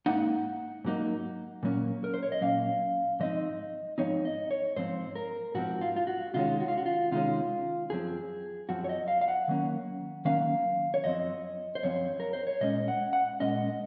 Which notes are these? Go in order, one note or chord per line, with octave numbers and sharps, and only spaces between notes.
G#2 F#3 A#3 D#4 F#5
G#2 F#3 A#3 D#4
A#2 F#3 A#3 C#4
A#4
C5
C#5
D#5
A#2 F#3 A#3 C#4 F5
G#2 F3 C4 D#4 D#5
G#2 F3 C4 D#4 C#5
D#5
C#5
G#2 F3 C4 C5
A#4
G#2 F3 C4 F#4
F4
F4
F#4
C3 D#3 G#3 C#4 F4
F#4
F4
F#4
F4
C3 D#3 G#3 C#4 F4
F#2 F3 C4 G#4
F#2 F3 C4 F#4
C#5
D#5
F5
F5
F#5
D#3 F#3 A#3 C#4
D#3 F#3 A#3 C#4 F5
C#5
F#2 F3 C4 D#5
C5
F#2 F3 C4 C#5
A#4
C5
C#5
A#2 G#3 C#4 D#5
F#5
F#5
A#2 G#3 C#4 D#5